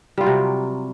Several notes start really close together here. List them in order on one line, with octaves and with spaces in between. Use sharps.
G3 F4 F#3 C3